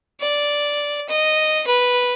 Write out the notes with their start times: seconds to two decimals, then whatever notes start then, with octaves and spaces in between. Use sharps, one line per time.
0.21 D5
1.09 D#5
1.67 B4